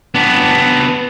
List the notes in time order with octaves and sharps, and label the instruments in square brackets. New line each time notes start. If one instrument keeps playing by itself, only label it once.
[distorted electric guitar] B3 D4